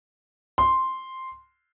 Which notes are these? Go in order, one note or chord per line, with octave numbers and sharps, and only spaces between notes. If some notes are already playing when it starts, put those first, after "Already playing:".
C6